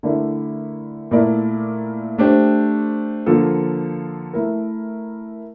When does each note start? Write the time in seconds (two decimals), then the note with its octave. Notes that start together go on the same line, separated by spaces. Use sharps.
0.03 D3 A3 E4 A#4 D5
1.11 A#2 A3 E4 A#4 D5
2.18 A3 D4 G4 C5
3.26 D3 F3 A#3 F4 A4
4.33 A3 E4 A#4